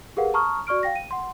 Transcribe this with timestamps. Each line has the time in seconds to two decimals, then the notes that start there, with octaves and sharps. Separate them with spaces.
0.17 G4 G#4 A#4 B4 F5 F#5
0.34 A5 A#5 C#6 D#6 F6
0.67 F#4 D5 C#6 F6 D7
0.83 F5 G5 A#6
0.96 D#7
1.11 F#5 C6